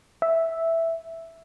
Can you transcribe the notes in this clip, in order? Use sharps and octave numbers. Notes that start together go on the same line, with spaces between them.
E5